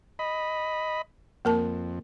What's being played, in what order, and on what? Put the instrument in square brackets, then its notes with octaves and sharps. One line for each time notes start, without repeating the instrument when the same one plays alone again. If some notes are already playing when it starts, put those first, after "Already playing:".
[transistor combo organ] D#5 B5
[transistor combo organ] F2 [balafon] A#3 A#4 A5